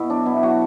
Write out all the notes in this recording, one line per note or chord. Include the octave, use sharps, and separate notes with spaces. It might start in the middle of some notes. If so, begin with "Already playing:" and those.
Already playing: B2 E4 F#4
F#3 D4
B2 E4
F#3 F#4